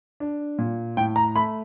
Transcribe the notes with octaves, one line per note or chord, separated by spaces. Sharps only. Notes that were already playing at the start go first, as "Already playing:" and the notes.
D4
A#2
A2 G5
A#5
A3 B5